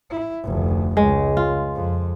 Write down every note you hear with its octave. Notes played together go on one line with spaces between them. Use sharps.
E4
F1 D2
C#2 G#3
F4
F2